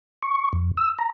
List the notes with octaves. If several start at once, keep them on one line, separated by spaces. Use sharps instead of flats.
C#6
F2
E6
A#5